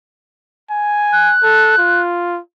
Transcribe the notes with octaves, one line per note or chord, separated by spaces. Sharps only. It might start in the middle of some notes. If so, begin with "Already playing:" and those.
G#5
F#6
A4
F4